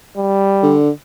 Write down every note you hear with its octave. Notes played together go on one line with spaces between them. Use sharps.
G3
D3